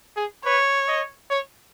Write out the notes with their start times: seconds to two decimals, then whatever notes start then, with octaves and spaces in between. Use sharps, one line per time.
0.16 G#4
0.44 B4 C#5
0.88 D#5
1.30 C#5